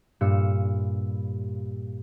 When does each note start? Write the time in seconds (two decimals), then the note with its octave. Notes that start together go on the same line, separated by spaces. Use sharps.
0.21 G2 A#2 F5 E6 C#7